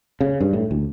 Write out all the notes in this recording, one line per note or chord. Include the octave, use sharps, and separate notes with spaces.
C#3
G2
A2
D2